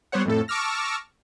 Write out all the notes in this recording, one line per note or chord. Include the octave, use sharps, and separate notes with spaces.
G3 B3 C5 C#5 F#5
F2 A2 A4
A5 C#6 D6 E6 F6 A#6